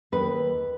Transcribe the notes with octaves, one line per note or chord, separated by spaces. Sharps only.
D#2 B4